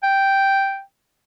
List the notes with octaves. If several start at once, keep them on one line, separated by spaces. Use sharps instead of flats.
G5